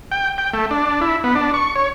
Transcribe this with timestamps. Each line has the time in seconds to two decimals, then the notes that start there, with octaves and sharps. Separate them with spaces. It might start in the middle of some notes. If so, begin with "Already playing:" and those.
0.12 G5
0.38 G5
0.53 A3
0.71 D4
1.01 E4
1.24 B3
1.35 D4
1.54 C#6
1.76 C#5